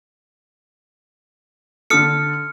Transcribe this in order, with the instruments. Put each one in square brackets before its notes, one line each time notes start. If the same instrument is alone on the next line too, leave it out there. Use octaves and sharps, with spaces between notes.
[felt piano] D3 A4 [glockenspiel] D#6 F6 C#7